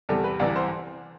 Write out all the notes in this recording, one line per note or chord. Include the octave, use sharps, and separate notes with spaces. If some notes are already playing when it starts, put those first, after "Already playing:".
E2 C3 G3 A4
B4
C2 C3 E3 D5
C5